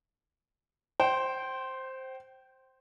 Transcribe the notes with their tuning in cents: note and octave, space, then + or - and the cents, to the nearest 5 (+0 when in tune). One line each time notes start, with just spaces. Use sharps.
C5 +5 G5 -25